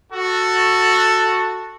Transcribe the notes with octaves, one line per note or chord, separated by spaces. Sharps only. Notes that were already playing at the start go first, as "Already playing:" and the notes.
F#4 A4